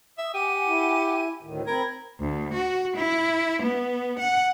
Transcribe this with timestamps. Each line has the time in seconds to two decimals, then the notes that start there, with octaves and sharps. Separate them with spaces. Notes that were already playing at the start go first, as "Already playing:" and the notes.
0.18 E5 D#6
0.34 G4 F#5 G#5 D6 D#7
0.67 E4
1.43 D2 A2 D#3
1.67 C4 A#4 B5 G#6
2.20 D2
2.54 F#4
2.96 E4
3.63 B3
4.19 F#5